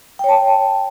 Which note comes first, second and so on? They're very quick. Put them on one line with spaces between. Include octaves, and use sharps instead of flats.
G5 C#5 A5